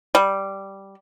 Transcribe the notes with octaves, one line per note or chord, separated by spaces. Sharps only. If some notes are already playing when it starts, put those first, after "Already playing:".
G3